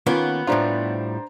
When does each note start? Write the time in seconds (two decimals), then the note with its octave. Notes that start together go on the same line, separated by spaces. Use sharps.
0.07 D#3 A#3 B3 C#4 F4
0.47 A2 G3 D4 F4 C5 A#5